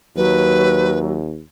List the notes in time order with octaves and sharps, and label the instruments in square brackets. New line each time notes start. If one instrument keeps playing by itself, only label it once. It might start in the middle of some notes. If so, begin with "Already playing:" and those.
[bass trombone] D#2 [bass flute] F#3 [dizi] B4